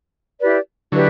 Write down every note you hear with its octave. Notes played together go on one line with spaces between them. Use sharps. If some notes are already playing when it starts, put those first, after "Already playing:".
E4 G4 B4 D5
D3 F#3 E4 G4 B4 D5